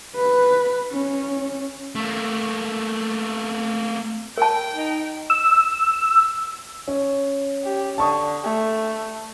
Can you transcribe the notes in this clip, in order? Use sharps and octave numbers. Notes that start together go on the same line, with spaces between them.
B4
C#4
A3 A#3
A#4 G5 A5
D#4
E6
C#4
G4
D3 A5 C#6 D#6
A3